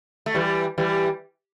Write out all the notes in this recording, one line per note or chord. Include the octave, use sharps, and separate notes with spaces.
A3
E3 G3
E3 G3